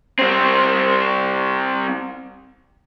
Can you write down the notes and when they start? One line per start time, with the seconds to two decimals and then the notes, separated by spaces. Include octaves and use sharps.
0.19 G3 C4